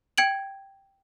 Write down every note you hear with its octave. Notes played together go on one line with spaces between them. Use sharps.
G5 G#6 D7 F#7